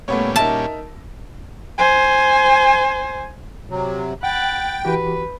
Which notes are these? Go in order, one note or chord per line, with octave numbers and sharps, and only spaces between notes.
A#2 G3 A3 B3 C#4 C#5
D#4 A#4 E5 A5
C5 G#5
C3 F#3
F#5 G5 B5 F#6 A6
E3 F#4 G4 B4